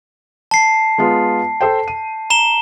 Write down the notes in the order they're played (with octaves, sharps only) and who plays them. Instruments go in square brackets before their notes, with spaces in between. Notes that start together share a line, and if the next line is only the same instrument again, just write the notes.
[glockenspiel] A5 C7
[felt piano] G#3 B3 F4
A4 C5 G5
D#7
[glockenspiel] A#5 E7 G7